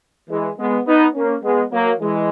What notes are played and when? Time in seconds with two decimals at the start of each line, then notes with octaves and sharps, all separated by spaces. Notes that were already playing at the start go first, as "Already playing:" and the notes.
0.30 E3 G#3
0.58 G#3 B3
0.87 B3 D#4
1.15 A#3 C#4
1.44 G#3 B3
1.72 F#3 A#3
2.00 E3 G#3